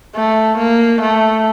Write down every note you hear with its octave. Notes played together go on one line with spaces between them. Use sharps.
A3
A#3
A3